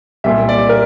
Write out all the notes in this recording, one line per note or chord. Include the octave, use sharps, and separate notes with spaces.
C2 A#2 E5
D5
A#4